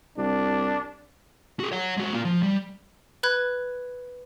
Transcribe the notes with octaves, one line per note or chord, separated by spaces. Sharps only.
C2 D4
F#4 G#4
C#5 F#5
G#3 F#4
A#3 F4
F3
G3
B4 B5 F#6 G#6